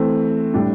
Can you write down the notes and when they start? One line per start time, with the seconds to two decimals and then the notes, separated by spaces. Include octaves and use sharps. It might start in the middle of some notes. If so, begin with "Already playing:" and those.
Already playing: E3 A3 C4
0.54 A2 G3 D4